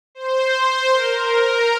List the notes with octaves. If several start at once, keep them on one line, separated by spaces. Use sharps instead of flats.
C5
C5
A#4
A#4